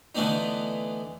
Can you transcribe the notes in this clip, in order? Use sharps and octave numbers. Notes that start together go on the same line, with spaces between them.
D3 E3 A3 B3 D4 D#4